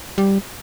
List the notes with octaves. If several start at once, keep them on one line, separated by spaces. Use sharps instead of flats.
G3